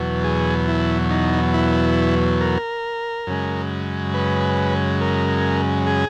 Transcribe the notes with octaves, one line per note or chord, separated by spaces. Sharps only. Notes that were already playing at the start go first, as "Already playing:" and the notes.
Already playing: E2 B2 F#3
G#4
E4
D#4
E4
A#4
F#2 C#3 G#3
B4
A#4
G#4